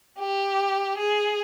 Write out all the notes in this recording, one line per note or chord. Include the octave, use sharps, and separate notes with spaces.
G4
G#4